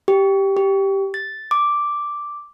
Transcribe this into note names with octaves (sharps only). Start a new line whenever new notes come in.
G4
G4
A6
D6